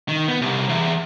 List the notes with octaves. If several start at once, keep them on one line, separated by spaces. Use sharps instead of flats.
D#3
B3
C2
E2